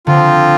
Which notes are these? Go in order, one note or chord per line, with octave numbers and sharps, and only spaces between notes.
D3 F3 C4 F4